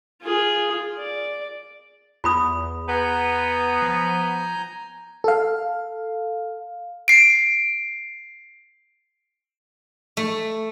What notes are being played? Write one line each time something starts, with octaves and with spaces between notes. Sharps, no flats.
F4 G#4
D5
E2 F4 B5 D#6
B3 G#5 A#5 G6
F3
A4 F5
C7 D7
A3